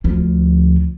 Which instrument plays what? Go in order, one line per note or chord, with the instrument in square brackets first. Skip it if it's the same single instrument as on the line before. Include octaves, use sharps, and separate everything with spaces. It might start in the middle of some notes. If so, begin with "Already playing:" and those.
[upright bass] D2 F3